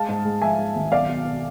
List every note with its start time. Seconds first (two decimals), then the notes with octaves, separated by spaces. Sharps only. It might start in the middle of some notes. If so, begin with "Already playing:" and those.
Already playing: G#3 F5 A5
0.09 G#2
0.25 G#3
0.42 F3 E5 G#5
0.59 G#2
0.76 G#1
0.92 B1 D5 F5
1.09 B2
1.25 B2